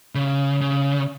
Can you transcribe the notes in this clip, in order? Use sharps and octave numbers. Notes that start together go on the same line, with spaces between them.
C#3
C#3